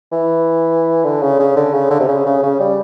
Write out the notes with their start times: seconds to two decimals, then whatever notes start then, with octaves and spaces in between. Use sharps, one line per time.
0.12 E3
1.04 D3
1.22 C#3
1.39 C#3
1.56 D3
1.74 C#3
1.91 D3
2.00 C3
2.08 C#3
2.26 C#3
2.43 C#3
2.60 G3